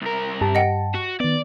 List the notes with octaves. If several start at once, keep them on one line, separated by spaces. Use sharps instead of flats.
C2 A#4
G2 G4 A5
D#5 F#5 G5
F#4
D#3 B3 D5